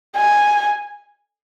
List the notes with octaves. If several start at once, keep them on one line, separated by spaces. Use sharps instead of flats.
G#5